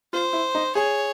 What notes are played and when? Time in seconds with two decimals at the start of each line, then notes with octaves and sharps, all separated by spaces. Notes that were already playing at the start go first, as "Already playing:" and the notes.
0.13 F4 C5
0.33 E4
0.55 D#4
0.75 G#4 C#5